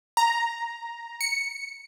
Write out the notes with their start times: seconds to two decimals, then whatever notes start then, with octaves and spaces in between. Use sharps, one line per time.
0.17 A#5
1.21 C#7